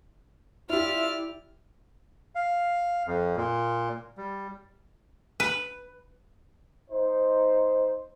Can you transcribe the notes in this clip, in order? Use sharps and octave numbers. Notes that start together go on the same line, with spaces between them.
E4 F4 G4 D5 E5 F6
F5
F2
A#2
G3
B4
D#4 C5